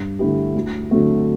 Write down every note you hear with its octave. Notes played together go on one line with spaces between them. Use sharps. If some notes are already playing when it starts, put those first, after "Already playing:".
Already playing: G2
D3 A3 E4 G4
D2
D3 F#3 A3 C4